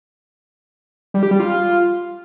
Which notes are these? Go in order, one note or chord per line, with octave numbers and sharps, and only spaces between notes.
G3
G4
G3
F4